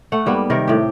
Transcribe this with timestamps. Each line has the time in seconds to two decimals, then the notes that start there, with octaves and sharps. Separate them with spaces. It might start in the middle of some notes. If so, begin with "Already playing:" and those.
0.12 A3 F#5
0.26 G#2 G3 A#3 B3
0.50 C3 D#3 A#4
0.67 A2 G4